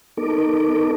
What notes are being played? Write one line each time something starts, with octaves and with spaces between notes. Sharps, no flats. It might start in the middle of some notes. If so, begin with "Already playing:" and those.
B3 D#4 A4 A#4 D6